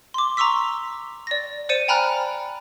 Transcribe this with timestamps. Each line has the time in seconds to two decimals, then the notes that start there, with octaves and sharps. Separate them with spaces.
0.14 C6 D6
0.37 A#5 C6 C#6 E6 B6
1.27 D5 A#6
1.69 C5 D5 C#7 D#7 E7
1.88 G5 G#5 A#5 B5 F6 F#6